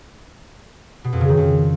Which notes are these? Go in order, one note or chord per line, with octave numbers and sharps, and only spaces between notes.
B2
F2
C#3
D#3
F2